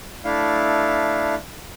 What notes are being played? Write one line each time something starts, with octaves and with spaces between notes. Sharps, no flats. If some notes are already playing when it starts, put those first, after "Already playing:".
A3 D4 E4 F5